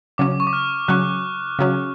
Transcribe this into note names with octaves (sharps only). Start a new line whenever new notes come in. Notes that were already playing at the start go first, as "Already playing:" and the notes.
C#3 F#3 C#4 D6
C#6
D6
F6
C#3 F#3 C#4 F#6
C#3 F#3 C#4